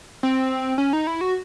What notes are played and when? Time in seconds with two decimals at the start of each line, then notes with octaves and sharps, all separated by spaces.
0.23 C4
0.78 C#4
0.93 D#4
1.07 E4
1.21 F#4